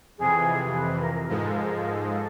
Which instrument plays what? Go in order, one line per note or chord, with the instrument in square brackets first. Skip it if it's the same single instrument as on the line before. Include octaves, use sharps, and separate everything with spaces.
[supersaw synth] F2 C3 E3 [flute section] G#4
[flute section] B4
B4
A#4
[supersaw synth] G#2 F3 G#3 [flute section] A4
[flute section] A#4
A4
A#4
A4
A#4
A4
A#4
A4
A#4
A4